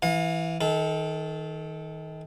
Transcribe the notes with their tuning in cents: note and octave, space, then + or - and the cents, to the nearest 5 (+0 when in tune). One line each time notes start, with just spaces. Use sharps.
E3 +0 F5 +40
D#3 +25 A4 -20